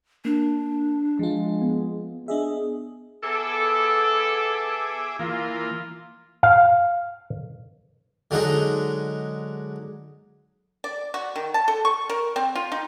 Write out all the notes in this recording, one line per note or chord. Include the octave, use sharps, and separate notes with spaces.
A#3 D4
F3 G#3 F4
B3
D4 G#4 D#5 E5
B3 G#4 A4 E5 D6
E3 A#3 F4
F5
D3 F#3 G#3 D#4
D5
F#4
D#3
A5
A4
C#6
A#4
C4
F4
D#4